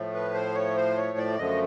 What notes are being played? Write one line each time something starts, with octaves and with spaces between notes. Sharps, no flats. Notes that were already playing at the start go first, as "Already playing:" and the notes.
Already playing: A2 F3 A3
B4
C5
C#5
C5
C#5
D5
F#2 D3 F3 A3 D#5